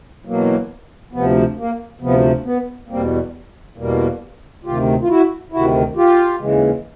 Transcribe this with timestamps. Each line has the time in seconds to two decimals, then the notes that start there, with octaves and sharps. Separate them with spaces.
0.25 E2 B2 F#3 A#3
1.13 D2 C3 F3 B3
1.58 A#3
2.00 D2 C3 F3 B3
2.45 B3
2.89 E2 B2 G3 A#3 C4
3.76 E2 B2 G3 A#3
4.64 D2 C3 D#3 F4 G4
5.02 F4
5.08 E4 F#4
5.52 D2 C3 D#3 E4 F#4
5.96 F4 G4
6.40 D#2 C#3 E3 G#3